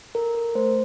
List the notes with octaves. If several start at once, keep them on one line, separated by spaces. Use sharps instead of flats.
A4 A#4
A#4
A3 C5